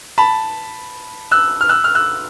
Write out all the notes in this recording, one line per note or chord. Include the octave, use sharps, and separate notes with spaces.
A5 B5
E6 F#6
F6
E6 F#6
F6
E6 F#6